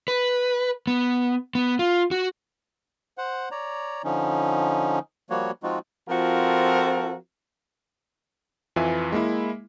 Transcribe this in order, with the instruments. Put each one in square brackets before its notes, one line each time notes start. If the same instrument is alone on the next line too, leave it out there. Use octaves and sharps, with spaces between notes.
[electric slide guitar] B4
B3
B3
F4
F#4
[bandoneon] C5 F#5
C#5 D5 A#5
D3 F3 C#4 D#4
F3 G3 A#3 F#4 C#5
F3 G#3 C4 D#4 F4 F#4
[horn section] F3 C4 F4 F#4 A4 A#4
[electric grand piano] F2 E3 F4 B4 E5 G#5
G#3 A#3 E4